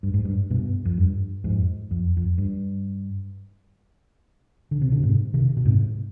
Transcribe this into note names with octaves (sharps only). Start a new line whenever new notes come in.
G2
G#2
G2
G2 B2
F2
G2
F2 G#2
F2
F2
G2
D3
C3
B2 D3
G#2 C3
C3 D#3
B2
G#2 C3